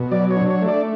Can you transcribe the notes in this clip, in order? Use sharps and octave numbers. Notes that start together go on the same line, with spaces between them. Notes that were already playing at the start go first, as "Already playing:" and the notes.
Already playing: B2
F#3 D5
C#5
D4
C#5
A3
D5